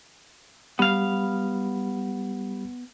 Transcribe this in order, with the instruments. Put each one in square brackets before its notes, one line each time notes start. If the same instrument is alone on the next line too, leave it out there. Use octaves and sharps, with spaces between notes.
[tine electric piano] G3 G4 B5 [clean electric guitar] B3 F5